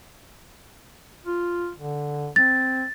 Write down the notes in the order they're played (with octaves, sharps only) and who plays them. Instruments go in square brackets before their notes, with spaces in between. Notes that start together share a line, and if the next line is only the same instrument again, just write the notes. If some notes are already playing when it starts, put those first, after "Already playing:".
[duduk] F4
D3
[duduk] C4 [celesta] A6